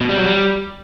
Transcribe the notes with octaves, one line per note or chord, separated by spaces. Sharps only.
B2
G3
F#3
G3